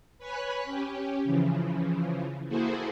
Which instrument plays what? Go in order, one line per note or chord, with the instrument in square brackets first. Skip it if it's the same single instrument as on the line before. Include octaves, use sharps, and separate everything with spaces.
[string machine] B4 C#5 G#5 B5 F#6
C#4 G4
C#3 E3 F3
A#3 E4 F#4 G#4 A4 C5